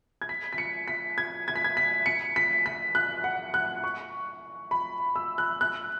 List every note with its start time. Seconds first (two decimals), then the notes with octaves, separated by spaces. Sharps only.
0.22 G#6
0.29 B6
0.53 B6
0.58 C#7
0.88 B6
1.18 G#6
1.48 G#6
1.56 B6
1.64 G#6
1.77 B6
2.06 C#7
2.36 B6
2.66 B6
2.95 F#6
3.24 F#5
3.54 F#6
3.84 C#6
4.71 B5
5.16 E6
5.38 F#6
5.61 F#6